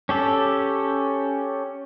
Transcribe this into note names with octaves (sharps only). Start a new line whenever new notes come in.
C#4 G4 A4